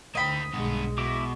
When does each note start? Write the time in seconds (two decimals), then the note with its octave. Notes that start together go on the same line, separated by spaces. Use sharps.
0.15 D2 A#3 D#5 G5 B5
0.53 B1 G2 G#3 B3
0.98 B2 E4 D6